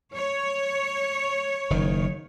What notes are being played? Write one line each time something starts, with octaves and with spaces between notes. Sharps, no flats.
C#5
F#1 D#3